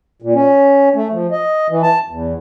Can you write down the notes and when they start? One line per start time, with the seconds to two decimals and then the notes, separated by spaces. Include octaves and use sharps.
0.22 A#2
0.35 C#4
0.96 A3
1.12 F3
1.31 D#5
1.70 E3
1.83 A5
2.10 E2